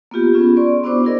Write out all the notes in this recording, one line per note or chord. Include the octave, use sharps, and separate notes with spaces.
A#3 B3 F4 G4
B3 C#4 F4 G#4
D5 C6 C#6
B3 D4 E4 F#4 C5 D6
E4 F#4 G#4 A#4 D5 D#5